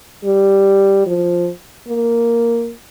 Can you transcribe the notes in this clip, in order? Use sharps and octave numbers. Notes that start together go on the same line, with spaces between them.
G3
F3
A#3